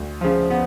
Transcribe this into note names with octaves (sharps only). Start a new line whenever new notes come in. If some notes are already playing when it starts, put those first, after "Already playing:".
Already playing: D2
C#3 F3
B3